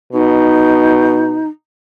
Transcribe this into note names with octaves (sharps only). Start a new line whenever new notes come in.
B2 D#4